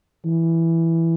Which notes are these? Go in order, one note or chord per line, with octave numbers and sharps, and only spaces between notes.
E3